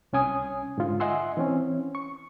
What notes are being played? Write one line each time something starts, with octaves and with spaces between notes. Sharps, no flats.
C2 C#4 G#5 D#6
G#2 D3 F4
D#5 E5 F#5 G#5 C6 E6
E3 C4 C#4
C#6